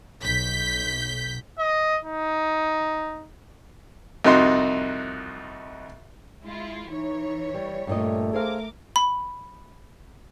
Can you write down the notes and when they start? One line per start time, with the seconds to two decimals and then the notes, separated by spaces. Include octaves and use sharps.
0.22 B1 G6 B6
1.59 D#5
2.04 D#4
4.25 C2 F2 D#4 F#4 D#5 C6
6.42 G#3 E4 F4
6.89 E3 D#4 C#5
7.54 G3
7.87 G2 A#2 A3 D#5
8.33 G#4 A#4 C5 F5 D6
8.96 B5